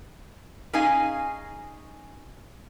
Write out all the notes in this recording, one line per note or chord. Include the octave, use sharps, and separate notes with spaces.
C#4 D#4 G#4 D#5 F5 G#5